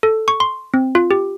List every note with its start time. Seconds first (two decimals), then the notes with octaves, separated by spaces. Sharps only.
0.03 A4
0.28 C#6
0.40 C6
0.74 C4
0.95 F4
1.11 G4